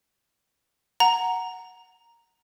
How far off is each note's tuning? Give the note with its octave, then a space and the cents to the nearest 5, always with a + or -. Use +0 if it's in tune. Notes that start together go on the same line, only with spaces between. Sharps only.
F#5 +0 A#5 +0